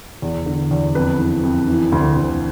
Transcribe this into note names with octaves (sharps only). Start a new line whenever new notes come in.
E2
D3
E2
F2 B4
E3
F2
E3
D2
D2